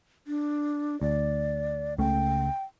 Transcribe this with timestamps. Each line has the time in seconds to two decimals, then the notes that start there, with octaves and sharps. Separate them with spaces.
0.27 D4
1.01 D2 D5
1.98 C#2 C#3 A3 G5